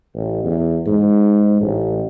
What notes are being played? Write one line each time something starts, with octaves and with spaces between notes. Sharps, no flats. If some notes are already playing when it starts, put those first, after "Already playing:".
A1
E2
G#2
A1